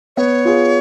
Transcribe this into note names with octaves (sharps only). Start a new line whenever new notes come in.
B3 C#5
F4 G#4